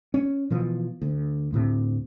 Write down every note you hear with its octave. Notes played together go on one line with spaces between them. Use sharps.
C#4
B2 E3 F3
D2
D2 A2 C3